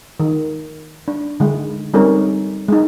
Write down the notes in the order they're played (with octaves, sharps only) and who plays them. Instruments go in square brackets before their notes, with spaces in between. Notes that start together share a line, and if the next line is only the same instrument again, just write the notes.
[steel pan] D#3
D4
D3 G#3
G3 C4 C#4 D#4 A4 A#4
G#3 D#4